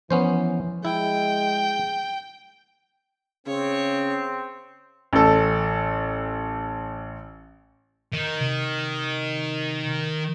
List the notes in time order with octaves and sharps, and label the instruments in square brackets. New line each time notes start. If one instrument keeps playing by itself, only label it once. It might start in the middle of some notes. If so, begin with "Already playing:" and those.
[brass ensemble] E3 [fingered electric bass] F3 [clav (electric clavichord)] B3 C#4 C5
[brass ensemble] G#3 [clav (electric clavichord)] E4 [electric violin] G5
[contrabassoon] C#3 [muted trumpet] C4 [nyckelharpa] C#5
[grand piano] A1 A4
[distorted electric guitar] D#3
[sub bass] C3